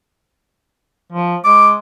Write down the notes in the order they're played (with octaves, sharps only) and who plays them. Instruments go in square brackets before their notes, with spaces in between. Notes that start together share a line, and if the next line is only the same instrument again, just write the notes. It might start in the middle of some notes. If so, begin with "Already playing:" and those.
[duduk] F3
[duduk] G#3 [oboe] D6